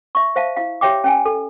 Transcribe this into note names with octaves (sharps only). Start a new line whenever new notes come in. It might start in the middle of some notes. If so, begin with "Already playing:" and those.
E5 C#6
C5 E5 F5 A5
E4 F5
G4 C#5 E5 G5 D6
C#4 G5 G#5
A4